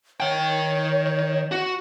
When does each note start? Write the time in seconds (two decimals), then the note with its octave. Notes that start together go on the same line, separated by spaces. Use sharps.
0.20 D#3 C#5 G5
1.51 F#4